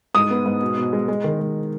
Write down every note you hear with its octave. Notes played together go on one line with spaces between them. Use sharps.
G#2 D#6
B3
G#2
B2
B2
G#3
G#3
D#3
G#3